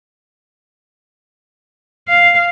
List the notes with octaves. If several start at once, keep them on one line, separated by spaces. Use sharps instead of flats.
F5